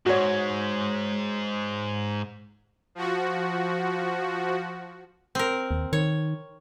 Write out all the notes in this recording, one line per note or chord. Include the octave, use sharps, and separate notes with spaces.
G#2 F#4 C#5
F3 F#4
C4 A#4
D#2
D#3 C#5